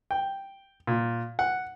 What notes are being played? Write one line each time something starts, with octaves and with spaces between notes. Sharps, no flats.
G5
A#2
F#5